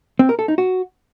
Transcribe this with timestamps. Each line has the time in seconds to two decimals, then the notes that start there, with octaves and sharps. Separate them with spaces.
0.19 C4
0.29 A#4
0.39 A4
0.48 D#4
0.58 F#4